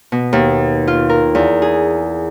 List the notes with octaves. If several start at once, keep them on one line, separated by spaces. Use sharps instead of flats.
B2
D#2
F4
A#4
E2
G#4